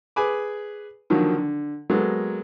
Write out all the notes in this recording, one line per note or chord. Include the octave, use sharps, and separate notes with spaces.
G#4 B4 G#5 B5 D6
D3 D#3 F3 F#3 A#3
D3
F#3 G#3 A#3 B3 A4